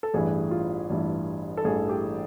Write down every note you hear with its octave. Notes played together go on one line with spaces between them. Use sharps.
A4
A1 G2 E3 G#4
F4
A1 G2 E3
A4
A1 G2 E3 G#4
G4